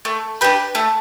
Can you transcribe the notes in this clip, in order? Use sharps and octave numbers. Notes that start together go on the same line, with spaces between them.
A3
D4 G4 B4
A3